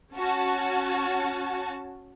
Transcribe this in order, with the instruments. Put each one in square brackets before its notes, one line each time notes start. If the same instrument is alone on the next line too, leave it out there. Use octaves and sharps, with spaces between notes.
[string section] C#4 F#4 A5